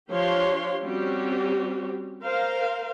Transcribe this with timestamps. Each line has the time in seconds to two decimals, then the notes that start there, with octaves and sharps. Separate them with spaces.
0.11 F3 D4 G4 C#5 F5 C6
0.83 G3 C4 C#4 F#4 G4
2.23 A#4 C5 F5